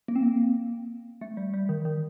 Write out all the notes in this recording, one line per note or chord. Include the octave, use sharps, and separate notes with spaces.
A#3
C4
A#3
A3
G3
G3
D#3
D#3